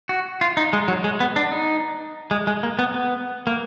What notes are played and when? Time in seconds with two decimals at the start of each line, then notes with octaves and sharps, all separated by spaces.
0.09 F#4
0.41 F4
0.57 D#4
0.73 G#3
0.88 F#3
1.04 G#3
1.20 B3
1.36 D4
1.52 D#4
2.31 G#3
2.47 G#3
2.63 A#3
2.79 B3
2.94 B3
3.47 A#3